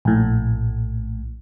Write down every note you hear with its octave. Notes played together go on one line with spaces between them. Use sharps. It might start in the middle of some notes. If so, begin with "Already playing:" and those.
A#1 A2